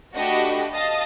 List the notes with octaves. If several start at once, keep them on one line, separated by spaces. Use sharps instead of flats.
A3 D4 F#4 G4 D#5 B5
D#5 F5 A5 D#6 A6